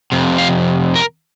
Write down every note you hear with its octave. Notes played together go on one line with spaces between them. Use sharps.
F2 C3
F5
A#4